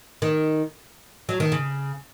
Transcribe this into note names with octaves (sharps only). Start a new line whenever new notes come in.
D#3
F#3
D#3
C#3